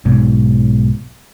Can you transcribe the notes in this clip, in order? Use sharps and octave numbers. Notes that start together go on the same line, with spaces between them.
B1 G#2 B2